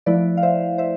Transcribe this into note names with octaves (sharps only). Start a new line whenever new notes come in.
F3 A3 E4 B4 D5
F5
C5 E5
C5 E5